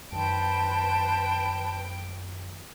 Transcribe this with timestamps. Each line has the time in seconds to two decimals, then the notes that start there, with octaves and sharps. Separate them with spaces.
0.12 F#2 D#3 B4 C5 G5 A5